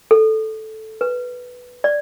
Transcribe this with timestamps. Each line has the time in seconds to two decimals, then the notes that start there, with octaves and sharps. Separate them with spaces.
0.11 A4
1.01 B4
1.84 D5